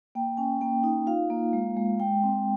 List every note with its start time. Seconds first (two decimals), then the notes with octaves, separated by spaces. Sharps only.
0.15 A#3 G5
0.37 C#4 G#5
0.61 A#3 G5
0.84 D#4
1.07 F4 F5
1.30 A#3
1.53 G#3
1.76 G#3
2.00 G#3 G5
2.23 C4